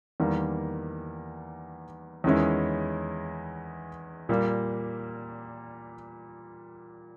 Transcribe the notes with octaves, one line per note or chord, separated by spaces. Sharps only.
E2 D#3 G3 A#3
E2 D#3 G#3 C#4 E4
A#2 G3 A#3